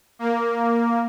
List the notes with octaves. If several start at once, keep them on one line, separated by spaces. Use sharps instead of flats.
A#3